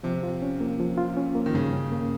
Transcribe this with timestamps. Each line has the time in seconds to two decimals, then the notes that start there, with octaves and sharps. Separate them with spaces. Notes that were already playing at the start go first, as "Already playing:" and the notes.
0.03 C3 F3
0.23 F4
0.42 C#4
0.61 A#3
0.79 F3
0.98 F4
1.17 C#4
1.35 A#3
1.46 D#3
1.54 G2 C#3
1.73 C#4
1.92 A#3